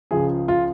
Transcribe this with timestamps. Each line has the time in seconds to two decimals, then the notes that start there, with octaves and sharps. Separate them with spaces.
0.11 C#2 C#3 F3 G#4
0.48 F4